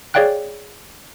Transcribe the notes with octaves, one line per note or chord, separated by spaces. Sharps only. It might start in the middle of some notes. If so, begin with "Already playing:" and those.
G#4 C#5 D5 F5 G5 F#6